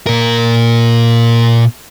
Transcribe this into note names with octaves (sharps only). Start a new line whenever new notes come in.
A#2 A#4